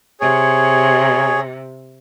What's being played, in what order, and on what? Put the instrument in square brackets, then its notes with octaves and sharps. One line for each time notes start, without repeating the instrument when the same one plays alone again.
[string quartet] C3 [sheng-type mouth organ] G#4 C#5